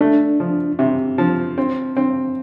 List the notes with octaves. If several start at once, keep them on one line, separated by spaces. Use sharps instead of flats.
A3 D4
F3
C3
F3
C4
C4